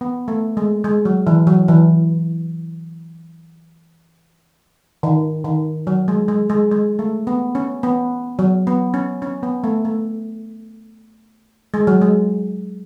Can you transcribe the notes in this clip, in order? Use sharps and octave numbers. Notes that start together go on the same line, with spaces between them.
B3
A3
G#3
G#3
F#3
E3
F#3
E3
D#3
D#3
F#3
G#3
G#3
G#3
G#3
A3
B3
C#4
B3
F#3
B3
C#4
C#4
B3
A3
A3
G#3
F#3
G#3